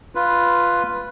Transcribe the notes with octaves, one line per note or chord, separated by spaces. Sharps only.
F4 B4